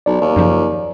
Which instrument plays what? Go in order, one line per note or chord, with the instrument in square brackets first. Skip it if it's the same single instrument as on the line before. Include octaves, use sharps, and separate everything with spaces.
[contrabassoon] B1 [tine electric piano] D5
[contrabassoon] D#2
[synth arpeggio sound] F#2 C#3 F3